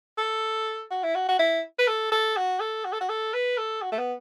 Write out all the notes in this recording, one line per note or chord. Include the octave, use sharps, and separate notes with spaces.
A4
F#4
E4
F#4
F#4
E4
B4
A4
A4
F#4
A4
F#4
A4
F#4
A4
B4
A4
F#4
A3
B3